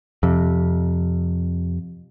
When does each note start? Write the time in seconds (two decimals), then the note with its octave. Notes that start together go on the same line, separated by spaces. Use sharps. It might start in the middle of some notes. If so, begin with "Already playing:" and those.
0.23 F2 C3